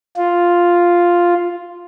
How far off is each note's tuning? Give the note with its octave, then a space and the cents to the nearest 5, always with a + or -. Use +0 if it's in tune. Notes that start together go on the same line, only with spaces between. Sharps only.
F4 +0